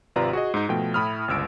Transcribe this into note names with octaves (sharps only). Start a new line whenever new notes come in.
G#1 C3 F4 B4 D5 A#5
F#4 G#4 D#5
G#2 D#4
B2 F3 A3 G5
A2 E4 B5 D#6 F6
G1 C#2 E6 D7